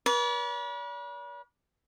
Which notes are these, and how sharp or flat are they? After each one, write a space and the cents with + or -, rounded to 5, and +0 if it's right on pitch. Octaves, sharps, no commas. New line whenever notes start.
B4 -40 D5 -40